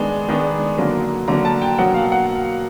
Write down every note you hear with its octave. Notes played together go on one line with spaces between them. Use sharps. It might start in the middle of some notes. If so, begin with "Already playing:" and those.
Already playing: D#3 G#3 B3 D4
D#3 G#3 B3 D4
D3 F#3 A#3
D3 F#3 A#3 A#5
A5
G5
B2 F#3 A#3 F#5
F5
F#5